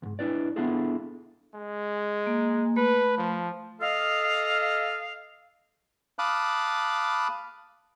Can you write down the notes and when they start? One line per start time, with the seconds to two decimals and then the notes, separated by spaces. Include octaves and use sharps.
0.02 C#2 G#2
0.19 D4 E4 B4 D5
0.56 B3 D4 E4 F4 G#4 A4
1.55 G#3
2.27 A#3
2.76 A3 B4
3.18 F3
3.81 A4 D#5 F5
6.19 F5 A5 B5 D6 D#6 F#6